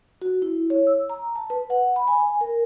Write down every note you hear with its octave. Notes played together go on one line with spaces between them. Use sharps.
F#4
E4
C#5
E6
A#5
A5
B4
F#5
B5
G#5
A#4